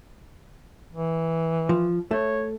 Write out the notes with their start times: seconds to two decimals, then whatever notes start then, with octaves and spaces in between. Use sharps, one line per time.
0.92 E3
1.69 F3
2.11 A3 C#5